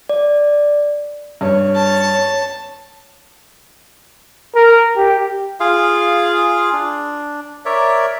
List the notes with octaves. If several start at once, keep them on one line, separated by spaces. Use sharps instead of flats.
D5
G2 C#5
A5
A#4
G4
F4 G#4 F5
D4
A#4 C#5 D5 E5